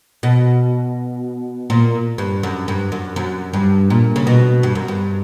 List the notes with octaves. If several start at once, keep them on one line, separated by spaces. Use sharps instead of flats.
B2
A#2
G2
F#2
G2
F#2
F#2
G2
A#2
C#3
B2
G2
F#2
G2